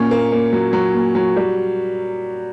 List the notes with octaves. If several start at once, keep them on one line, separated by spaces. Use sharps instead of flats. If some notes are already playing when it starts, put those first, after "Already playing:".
Already playing: A#2 C#4
A#3
A#3
F#3
F#3
A#2
F#3
G3